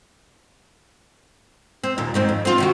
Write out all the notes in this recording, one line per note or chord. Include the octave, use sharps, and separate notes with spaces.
C4
D#2 A#2
G#2 D#3 C4
F2
C4 F4
C3 D#3 F#4